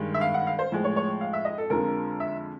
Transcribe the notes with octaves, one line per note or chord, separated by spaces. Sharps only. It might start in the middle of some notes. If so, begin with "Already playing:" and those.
Already playing: G2 D#3 G#3
E5
F5
F#5
F5
C5
A2 F3 G#3
C#5
C#5
F5
E5
D#5
A4
F2 D3 F3 G#3 A#4
E5